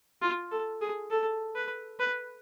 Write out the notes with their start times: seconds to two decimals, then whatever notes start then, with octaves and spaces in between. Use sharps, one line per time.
0.22 F4
0.51 A4
0.81 G#4
1.11 A4
1.55 B4
2.00 B4